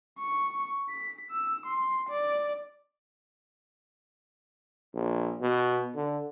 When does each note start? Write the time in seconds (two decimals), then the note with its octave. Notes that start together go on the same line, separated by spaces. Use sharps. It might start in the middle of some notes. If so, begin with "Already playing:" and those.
0.19 C#6
0.89 B6
1.31 E6
1.66 C6
2.09 D5
4.94 A#1
5.41 B2
5.95 D3